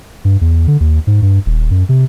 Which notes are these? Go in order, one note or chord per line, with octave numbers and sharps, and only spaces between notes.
G2
E2
D3
D#2
G#2
G2
D#1
F#2
C3